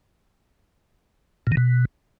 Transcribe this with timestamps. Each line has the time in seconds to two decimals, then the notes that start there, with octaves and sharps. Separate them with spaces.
1.47 A#2
1.52 D#3
1.57 B2